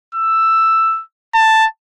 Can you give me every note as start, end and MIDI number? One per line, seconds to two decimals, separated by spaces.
0.15 1.02 88
1.34 1.66 81